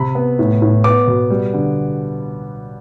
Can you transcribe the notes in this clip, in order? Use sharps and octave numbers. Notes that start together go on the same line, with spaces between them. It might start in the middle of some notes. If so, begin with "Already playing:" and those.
Already playing: C3 B5
B3
A2
A2
B3 D6
B2
G3
D3